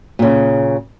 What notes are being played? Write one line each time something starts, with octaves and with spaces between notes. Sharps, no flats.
A#2 C#3